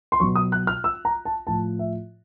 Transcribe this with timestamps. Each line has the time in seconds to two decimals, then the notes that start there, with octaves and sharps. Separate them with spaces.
0.12 C6
0.20 B2 F#3 C#6
0.35 D#6
0.52 F#6
0.67 F6
0.84 E6
1.05 A#5
1.25 A5
1.47 A2 F3 A5
1.79 E5